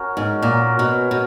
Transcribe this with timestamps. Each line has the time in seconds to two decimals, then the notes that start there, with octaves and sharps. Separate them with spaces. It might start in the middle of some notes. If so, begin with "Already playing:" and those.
Already playing: C#4 F#4 A#4
0.17 G#2
0.42 A#2
0.79 B2
1.11 B2